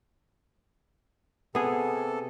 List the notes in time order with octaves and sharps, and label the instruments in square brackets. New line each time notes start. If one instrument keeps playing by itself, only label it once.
[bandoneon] C3 A4 [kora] B3 G#4